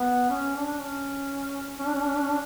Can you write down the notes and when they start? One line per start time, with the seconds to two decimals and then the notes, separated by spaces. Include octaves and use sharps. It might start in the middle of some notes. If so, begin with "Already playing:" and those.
Already playing: B3
0.30 C#4
0.55 D4
0.80 C#4
1.79 C#4
1.87 D4
1.95 C#4
2.01 D4
2.08 C#4
2.16 D4
2.24 C#4
2.31 D4